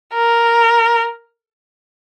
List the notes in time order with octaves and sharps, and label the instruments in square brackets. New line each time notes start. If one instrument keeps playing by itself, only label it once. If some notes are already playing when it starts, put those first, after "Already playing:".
[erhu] A#4